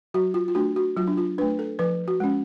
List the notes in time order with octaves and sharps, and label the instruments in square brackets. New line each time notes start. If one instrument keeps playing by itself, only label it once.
[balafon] F#3 F#4
F4
F4
A3 D4 F#4
F#4
F#3 F4
D4
F4
A3 D4 B4
A4
F3 B4
F#4
G#3 C#4